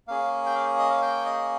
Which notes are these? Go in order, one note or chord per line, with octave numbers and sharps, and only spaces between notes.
A#3 C#4 G#4 F5
G5
F5
D#5
F5
G5
D#5